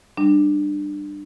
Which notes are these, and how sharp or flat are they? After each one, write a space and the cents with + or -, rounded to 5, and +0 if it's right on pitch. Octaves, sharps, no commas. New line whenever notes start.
G3 +10 D4 +25